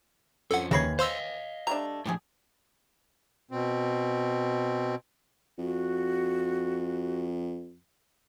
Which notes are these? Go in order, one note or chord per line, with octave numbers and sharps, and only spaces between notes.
F2 F3 C#4 A4 F#5
D#2 C#3 E3 C#5 B5 G#6 A#6 C7
C5 D#5 F5 C6 E6 F7
G3 A3 D4 A#5
A2 F3 D4 G4 G#4
B2 C4
F2 F#4